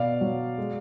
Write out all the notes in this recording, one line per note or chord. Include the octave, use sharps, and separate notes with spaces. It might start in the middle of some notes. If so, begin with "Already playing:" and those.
Already playing: B2 D5 F5
F#3
G#3